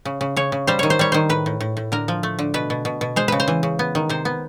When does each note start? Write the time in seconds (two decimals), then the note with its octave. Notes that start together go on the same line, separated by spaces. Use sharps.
0.05 C#3
0.21 C#3
0.36 C#3 C#5
0.52 C#3
0.67 G3 C5
0.79 D#3 C#5
0.90 C5
0.99 G3 C#5
1.12 D#3 C5
1.29 A2 B4
1.46 A2
1.61 A2
1.77 A2
1.92 D3 A#4
2.08 F3
2.23 A3
2.39 D3
2.54 B2 B4
2.70 B2
2.85 B2
3.01 B2
3.16 G#3 C5
3.28 C#3 B4
3.40 C5
3.48 E3
3.63 C#3
3.79 B3
3.95 D#3
4.09 C3 C5
4.25 B3